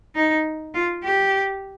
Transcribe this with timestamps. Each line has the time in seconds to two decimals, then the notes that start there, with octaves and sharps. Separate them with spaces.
0.15 D#4
0.74 F4
1.04 G4